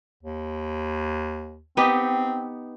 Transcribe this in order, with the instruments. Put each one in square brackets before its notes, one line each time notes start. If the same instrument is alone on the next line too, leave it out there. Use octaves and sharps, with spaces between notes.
[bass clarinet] D#2
[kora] B3 D#4 G4 [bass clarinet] C4